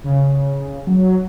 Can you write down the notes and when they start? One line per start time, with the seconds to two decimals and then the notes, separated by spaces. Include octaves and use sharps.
0.04 C#3
0.87 F#3